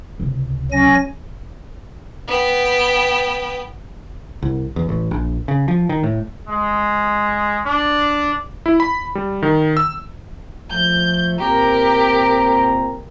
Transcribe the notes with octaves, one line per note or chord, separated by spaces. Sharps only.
C#2 C3
F#3 C#4 G#5 A#6
B3 G5
C2
E2
A1
A#1
C#3
F3
D#3
A2
G#3
D4
E4
B5
G3
D#3
E6
F3 A3 G6
A#2 C4 G4 A#4 A#5